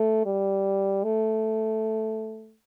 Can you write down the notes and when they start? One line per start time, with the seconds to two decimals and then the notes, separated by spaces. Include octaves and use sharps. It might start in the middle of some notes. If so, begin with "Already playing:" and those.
Already playing: A3
0.26 G3
1.04 A3